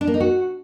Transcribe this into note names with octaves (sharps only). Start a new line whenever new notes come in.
D4
A#3
D#4
F#4